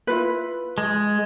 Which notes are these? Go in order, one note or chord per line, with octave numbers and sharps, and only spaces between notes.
E4 F4 B4
G#3